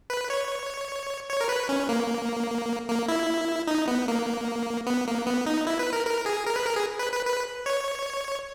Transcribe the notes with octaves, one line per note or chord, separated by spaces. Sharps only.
B4
C#5
C#5
A#4
B4
C#4
A#3
A#3
E4
D#4
B3
A#3
B3
A#3
B3
D#4
E4
B4
A#4
A#4
G#4
A#4
B4
A#4
G#4
B4
B4
B4
C#5